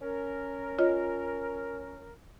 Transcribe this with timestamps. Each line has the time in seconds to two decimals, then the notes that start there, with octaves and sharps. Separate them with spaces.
0.01 C#4 A#4
0.79 F4 C#5 D#5